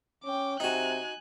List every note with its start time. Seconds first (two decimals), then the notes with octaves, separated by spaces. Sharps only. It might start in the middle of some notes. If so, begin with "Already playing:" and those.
0.24 C#4 G5 D6
0.60 C3 D#4 F#4 G#5 F#6